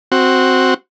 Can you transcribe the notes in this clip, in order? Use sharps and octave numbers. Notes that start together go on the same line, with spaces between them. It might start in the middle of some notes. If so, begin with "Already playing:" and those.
C4 F#4